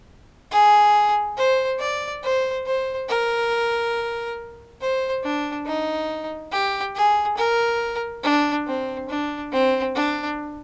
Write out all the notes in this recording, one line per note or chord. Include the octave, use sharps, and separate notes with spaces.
G#4
C5
D5
C5
C5
A#4
C5
D4
D#4
G4
G#4
A#4
D4
C4
D4
C4
D4